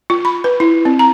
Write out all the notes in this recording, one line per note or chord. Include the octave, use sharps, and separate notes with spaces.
F4
B5
B4
E4
C4
A#5